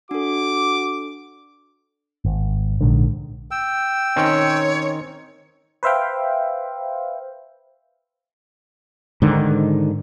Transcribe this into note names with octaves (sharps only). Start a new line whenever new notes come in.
D4 F#4 A4 D6
G#1
A#1 G#2 D3
G5 E6
D#3 C4 C#4 C#5
B4 C5 E5 F5 G5
G#2 D3 D#3